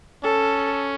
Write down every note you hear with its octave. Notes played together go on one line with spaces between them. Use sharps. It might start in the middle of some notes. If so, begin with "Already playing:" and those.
C#4 A4